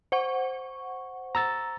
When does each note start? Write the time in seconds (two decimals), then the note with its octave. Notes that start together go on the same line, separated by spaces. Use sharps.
0.12 C5 F#5 C#6
1.35 A#5 E6 A6